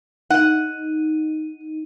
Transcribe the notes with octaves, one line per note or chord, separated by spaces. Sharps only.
D#4 F#5